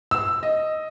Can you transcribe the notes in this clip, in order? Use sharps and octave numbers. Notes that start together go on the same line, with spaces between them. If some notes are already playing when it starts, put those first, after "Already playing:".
E6
D#5